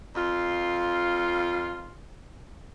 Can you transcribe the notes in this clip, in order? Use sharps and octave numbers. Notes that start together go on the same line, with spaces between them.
F2 F4